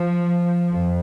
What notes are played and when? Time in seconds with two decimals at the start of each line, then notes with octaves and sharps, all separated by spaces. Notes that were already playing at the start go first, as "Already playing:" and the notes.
Already playing: F3
0.72 F2